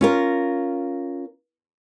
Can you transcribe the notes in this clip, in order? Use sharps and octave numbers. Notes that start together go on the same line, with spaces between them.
C#4 F4 A#4